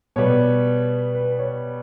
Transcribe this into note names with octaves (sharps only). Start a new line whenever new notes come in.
B2 G3 B3 C#5
B4
C#5